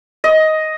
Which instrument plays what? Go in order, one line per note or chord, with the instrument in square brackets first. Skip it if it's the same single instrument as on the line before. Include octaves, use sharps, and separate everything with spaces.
[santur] D#5